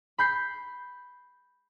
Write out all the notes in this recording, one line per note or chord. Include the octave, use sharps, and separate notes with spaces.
B5 G6 C7